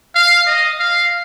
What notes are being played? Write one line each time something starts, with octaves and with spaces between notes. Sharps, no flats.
F5
D#5
F5